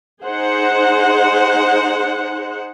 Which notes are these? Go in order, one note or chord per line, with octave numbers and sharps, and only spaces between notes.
D#4 G#4 C5 F#5